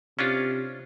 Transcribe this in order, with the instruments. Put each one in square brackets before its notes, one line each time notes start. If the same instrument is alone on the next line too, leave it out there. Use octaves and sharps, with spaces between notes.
[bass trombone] C3 [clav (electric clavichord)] C#4 D4 F4